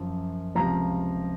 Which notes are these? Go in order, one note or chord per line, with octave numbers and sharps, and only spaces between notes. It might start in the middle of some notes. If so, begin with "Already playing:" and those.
Already playing: F#2 F3
C#2 C3 F3 A#5